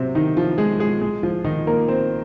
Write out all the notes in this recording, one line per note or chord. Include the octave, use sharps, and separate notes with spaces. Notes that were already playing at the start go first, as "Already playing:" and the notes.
Already playing: C3 F#3 C4
D#3 D#4
F3 F4
G#3 G#4
G#3 G#4
G#3 G#4
F3 F4
D#3 D#4
A#3 A#4
C4 C5